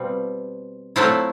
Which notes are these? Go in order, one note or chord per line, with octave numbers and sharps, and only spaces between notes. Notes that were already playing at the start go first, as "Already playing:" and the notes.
Already playing: B2 G3 C4 F4
F#3 A3 C4 E4 F4